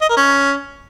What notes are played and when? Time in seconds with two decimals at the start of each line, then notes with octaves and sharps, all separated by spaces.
0.01 D#5
0.09 A#4
0.17 C#4